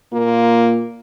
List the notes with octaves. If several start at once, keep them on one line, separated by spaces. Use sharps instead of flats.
A#2 A#3 F4 A#4